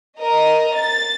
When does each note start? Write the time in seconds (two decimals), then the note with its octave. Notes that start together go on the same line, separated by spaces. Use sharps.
0.20 A#4 D#5
0.75 A6